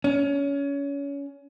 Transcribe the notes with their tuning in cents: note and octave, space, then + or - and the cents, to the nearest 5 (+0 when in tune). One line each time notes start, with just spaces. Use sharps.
C#4 +25